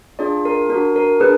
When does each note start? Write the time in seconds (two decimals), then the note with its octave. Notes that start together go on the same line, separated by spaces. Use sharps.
0.19 D4 F4 G#4 D5
0.45 A#4
0.70 D4 A#4
0.75 F#4
0.96 A#4
1.20 D4 G#4 B4